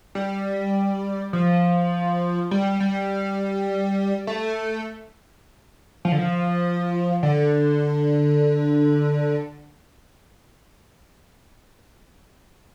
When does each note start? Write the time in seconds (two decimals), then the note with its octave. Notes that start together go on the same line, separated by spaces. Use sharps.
0.15 G3
1.33 F3
2.51 G3
2.80 G3
4.27 A3
6.05 F3
6.12 D3
6.19 F3
7.23 D3